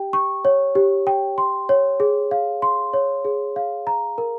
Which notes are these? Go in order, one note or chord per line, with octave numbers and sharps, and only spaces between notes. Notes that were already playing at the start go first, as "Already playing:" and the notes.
Already playing: G4 G5
C#6
C#5
G4
G5
C6
C#5
G#4
F5
C6
C#5
G#4
F5
A#5
A#4